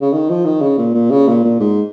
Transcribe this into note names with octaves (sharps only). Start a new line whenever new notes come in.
C#3
D#3
F3
D#3
C#3
A#2
A#2
C#3
A#2
A#2
G#2